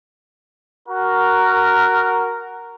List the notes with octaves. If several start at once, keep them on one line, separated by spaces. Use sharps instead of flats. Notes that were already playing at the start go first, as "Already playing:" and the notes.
F#4 A#4